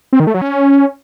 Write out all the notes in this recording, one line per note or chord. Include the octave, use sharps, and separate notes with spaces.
C4
D#3
A3
F#3
C#4